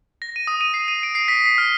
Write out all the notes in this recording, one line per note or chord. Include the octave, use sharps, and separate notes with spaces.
A#6
D#7
D#6
D#7
C7
D#7
D7
C7
B6
C7
F6